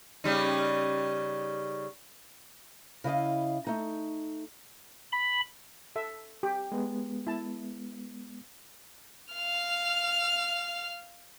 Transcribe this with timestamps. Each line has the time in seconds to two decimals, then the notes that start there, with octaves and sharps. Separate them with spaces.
0.24 C#3 G3 D#4
3.04 C#3 E4 D#5 F5
3.67 A3 D#4
5.12 B5
5.96 A4 E5
6.43 G4
6.72 G#3 B3
7.27 E4 A5
9.33 F5 F6